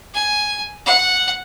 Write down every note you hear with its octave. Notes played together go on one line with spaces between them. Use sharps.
G#5
F#5